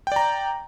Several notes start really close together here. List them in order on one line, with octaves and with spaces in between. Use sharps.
G5 D5 A#5